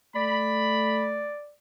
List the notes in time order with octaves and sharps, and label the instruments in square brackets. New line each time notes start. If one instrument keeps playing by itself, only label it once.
[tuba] A3 [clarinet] D5 [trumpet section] B5